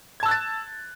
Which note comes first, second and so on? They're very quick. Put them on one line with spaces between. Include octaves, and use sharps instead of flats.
G#6 A5 E6 F#6 A6